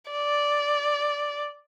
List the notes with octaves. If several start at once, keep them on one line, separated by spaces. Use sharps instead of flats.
D5